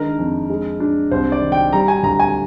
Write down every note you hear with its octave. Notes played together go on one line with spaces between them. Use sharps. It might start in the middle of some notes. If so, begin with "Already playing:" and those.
Already playing: D#3 G#3 D4 A#4
F2
G#3
D4
C2 C5
D5
D#3
G5
G3 A#5
G#5
D2 A#5
G#5